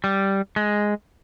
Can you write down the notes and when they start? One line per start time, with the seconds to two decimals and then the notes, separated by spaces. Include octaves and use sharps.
0.04 G3
0.56 G#3